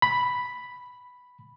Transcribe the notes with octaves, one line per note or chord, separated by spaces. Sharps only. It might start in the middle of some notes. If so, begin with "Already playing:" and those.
B5